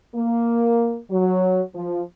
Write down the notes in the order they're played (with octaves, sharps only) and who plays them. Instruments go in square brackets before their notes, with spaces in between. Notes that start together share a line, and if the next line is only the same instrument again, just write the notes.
[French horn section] A#3
F#3
F3